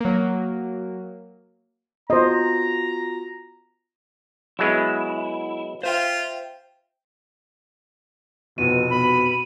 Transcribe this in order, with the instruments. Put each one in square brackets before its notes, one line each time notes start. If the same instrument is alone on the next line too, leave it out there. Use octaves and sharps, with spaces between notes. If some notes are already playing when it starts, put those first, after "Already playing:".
[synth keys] F#3 A#3
[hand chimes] B3 F4 F#4 [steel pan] C5 D#5 [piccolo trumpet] A#5
[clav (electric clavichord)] F#3 G#3 B3 [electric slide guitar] E4
[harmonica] F4 [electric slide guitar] C5 E5 G5
[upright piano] F1 F2 [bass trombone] B2 [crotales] D#7
[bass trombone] B2 [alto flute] B5